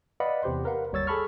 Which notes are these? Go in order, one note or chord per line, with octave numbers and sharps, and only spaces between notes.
B4 D5 D#5 F5 F#5 B5
E2 C3 G4 C5 C6
A#4 B4 F5 F#5
G1 D#2 G3 C#5 E6 A6
G#4 A4 A5 B5 C#6 F6